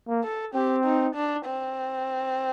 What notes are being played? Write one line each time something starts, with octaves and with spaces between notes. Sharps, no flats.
A#3
A4
C4 G4
D#4
D4
C4